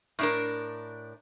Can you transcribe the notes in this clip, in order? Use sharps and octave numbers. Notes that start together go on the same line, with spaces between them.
A2 D4 A#4